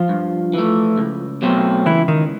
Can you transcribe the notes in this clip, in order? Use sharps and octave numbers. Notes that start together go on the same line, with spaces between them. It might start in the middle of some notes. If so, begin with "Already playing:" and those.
Already playing: F3 F4
G2
E3 A3
C#2
B2 F#3 A3 C4
C#2 E3 E4
D#3 D#4